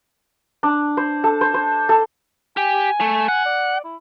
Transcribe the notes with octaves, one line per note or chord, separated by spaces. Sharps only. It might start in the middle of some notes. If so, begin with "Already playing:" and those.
D4
C5
A4
C5
C5
A4
G4 G#5
A3
F#5
D5
E4